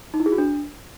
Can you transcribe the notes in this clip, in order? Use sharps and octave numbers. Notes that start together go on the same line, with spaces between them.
D#4
E4
G#4
F#4
D4